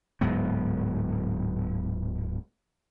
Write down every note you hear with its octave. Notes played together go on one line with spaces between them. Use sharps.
D1 G#2 F#3 B3